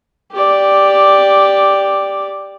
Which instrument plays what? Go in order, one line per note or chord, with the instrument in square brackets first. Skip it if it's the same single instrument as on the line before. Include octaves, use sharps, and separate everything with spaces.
[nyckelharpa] G4 D5